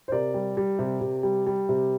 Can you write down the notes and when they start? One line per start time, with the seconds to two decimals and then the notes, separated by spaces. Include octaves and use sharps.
0.08 C5
0.12 C3 A#4 D5
0.34 G3
0.57 G3
0.79 C3
1.01 C3
1.23 G3
1.47 G3
1.69 C3